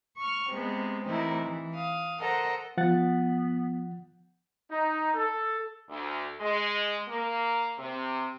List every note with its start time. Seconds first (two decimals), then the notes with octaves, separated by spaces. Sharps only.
0.18 C#6 F6
0.51 C3 G#3 B3
1.04 C3 E3 A3 D#4 E4 A#4
1.45 E3
1.75 F5 D#6
2.20 A4 A#4 C5 D#5 F#5 A#5
2.77 F3 B3 F#5 A6
4.70 D#4
5.14 A4
5.88 D2
6.40 G#3
7.09 A#3
7.78 C3